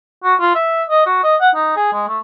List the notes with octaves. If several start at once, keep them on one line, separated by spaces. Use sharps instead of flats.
F#4
F4
E5
D#5
F#4
D#5
F#5
D#4
G#4
G#3
A3